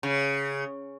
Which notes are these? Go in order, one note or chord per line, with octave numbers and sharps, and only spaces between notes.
C#3